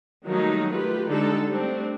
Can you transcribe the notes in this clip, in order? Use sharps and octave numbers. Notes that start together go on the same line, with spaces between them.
D#3 F#3 G3 A3 A#3 D#4
A3 F4 G4 B4
D3 G3 G#3 D4 D#4 A4
G3 A3 C4 D4